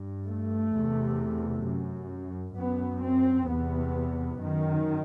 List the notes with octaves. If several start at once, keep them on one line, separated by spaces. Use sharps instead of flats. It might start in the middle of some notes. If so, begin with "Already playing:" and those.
Already playing: G2
A3
E2 C3
F#2
F#2 B3
C4
E2 C3 B3
F#2 D#3